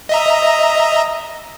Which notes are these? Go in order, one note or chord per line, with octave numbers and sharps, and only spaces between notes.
D#5 E5 A#5